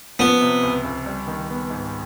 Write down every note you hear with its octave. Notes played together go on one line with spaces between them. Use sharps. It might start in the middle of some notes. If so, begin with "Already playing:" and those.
F3 B3
C3
C#2
C#2
G3
D#3
B3
G#2